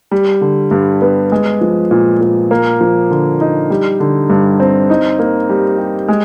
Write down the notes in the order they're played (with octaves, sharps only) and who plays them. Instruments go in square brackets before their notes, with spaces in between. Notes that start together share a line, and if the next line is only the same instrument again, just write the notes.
[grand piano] G3
D3
G2
B3
G#3
F3
A#2
A#2
A#3
F3
D3
D#4
G3
D3
G2
C4
D#4
A#3
G3
G4
G#3